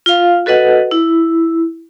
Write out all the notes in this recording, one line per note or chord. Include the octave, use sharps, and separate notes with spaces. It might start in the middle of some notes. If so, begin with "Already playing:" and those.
F4 F5
F#4 A4 B4 D#5 F#5
E4